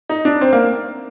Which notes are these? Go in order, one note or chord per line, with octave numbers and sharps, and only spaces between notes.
D#4
D4
C4
A#3